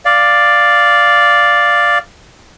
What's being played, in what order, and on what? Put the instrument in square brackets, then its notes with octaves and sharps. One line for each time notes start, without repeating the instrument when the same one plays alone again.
[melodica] D5 F5